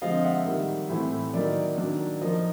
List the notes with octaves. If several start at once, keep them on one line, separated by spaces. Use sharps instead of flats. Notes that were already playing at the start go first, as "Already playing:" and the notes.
D3 F3 G#3 C4 D#5 F5
E5 F#5
D#3 G3 A#3
A2 E3 A3 C4 E4
D#3 F#3 A#3 D#4 D5 E5
D#3 F#3 A#3 D4
F3 A#3 D#4 D#5